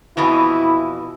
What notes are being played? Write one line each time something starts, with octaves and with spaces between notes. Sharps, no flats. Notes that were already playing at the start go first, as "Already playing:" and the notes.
F2 B2 E3 E4